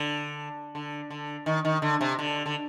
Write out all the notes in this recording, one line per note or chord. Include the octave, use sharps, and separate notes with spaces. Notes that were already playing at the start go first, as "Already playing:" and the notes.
Already playing: D3
D3
D3
D#3
D#3
D3
C3
D3
D3